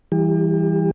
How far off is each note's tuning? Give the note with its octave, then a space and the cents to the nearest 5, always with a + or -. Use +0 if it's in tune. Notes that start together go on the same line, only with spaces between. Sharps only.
E3 +0 G3 +0 G4 +40